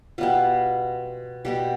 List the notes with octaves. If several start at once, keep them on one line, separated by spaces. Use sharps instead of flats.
B2 G3 B3 F4
B2 G3 B3 G4